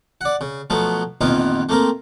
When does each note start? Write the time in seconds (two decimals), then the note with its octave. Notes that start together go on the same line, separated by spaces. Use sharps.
0.21 D5 F#5
0.41 C#3
0.70 B2 F3 F#3 A3 B3
1.21 A#1 F2 D#3 E3 B3 F4
1.69 A3 A#3 C4 A#4